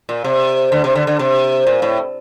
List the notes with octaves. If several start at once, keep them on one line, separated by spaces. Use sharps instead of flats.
A#2
C3
D3
C3
D3
D3
C3
A#2
A2